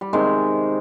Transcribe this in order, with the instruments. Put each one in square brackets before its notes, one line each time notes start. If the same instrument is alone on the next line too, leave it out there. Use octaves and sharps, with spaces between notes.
[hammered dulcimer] G3
C3 D#3 G#3